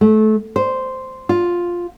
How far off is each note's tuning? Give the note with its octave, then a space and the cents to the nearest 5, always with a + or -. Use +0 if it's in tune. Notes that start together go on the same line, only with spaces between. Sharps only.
A3 -25
C5 -5
F4 +5